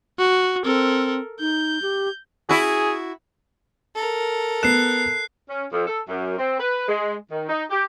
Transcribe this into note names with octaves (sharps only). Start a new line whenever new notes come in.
F#4
C4 A4 A#4
D#4 G6
G4
E4 F#4 G#4
A4 A#4
B3 F#6 C7 E7
C#4
F2
A4
F#2
C4
B4
G#3
D#3
D#4
G4